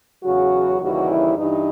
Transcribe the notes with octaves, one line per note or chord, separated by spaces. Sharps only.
E2 C#3 F#3 F#4
D#2 C#3 E3 G3 F#4
E4
G2 E3 D#4